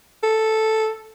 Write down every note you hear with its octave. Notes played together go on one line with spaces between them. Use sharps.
A4